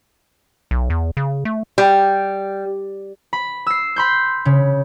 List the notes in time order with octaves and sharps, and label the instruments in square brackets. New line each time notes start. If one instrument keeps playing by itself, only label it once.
[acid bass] B1
E2
C#3
A3
[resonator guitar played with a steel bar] G3
[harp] B5
E6 C7
B5 C6 G6
C#3